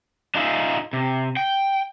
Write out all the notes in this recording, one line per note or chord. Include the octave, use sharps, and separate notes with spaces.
D4 D#4 F4 G#4 E5
C3
G5